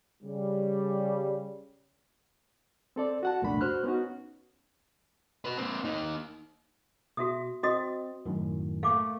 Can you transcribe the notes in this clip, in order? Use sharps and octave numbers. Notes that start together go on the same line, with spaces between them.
C#3 G3
C4 A4 D5
F#4 F#5 A5
C2 F2 A#2 A3 D4 B5
F#4 C5 F6 F#6
B3 C#4 D#4 F#4
F#4 B4
A#3 C4
A#3 D#4
B2 F#4 E5 D#6
C4 F#4 D#5 D#6
F#2 A2 D#3
A3 A#3 F5 D6